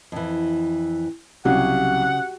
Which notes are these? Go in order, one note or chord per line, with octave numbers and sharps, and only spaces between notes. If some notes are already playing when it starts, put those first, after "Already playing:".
F2 E3
C2 C#3 F#3 C#4 F#4 G4 F#5